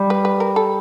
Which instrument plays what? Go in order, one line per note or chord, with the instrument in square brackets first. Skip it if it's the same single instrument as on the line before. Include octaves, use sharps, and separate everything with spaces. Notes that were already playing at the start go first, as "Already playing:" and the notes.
Already playing: [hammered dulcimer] G3
[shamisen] B4
B4
A#4
A4